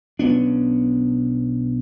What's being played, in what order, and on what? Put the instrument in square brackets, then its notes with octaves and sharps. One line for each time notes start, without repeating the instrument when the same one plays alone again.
[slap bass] B1 B3 C#4 D4